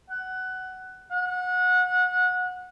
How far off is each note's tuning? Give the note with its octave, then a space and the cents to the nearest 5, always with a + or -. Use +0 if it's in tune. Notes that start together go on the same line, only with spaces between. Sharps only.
F#5 +15
F#5 -25